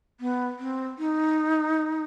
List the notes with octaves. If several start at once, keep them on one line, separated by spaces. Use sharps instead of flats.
B3
C4
D#4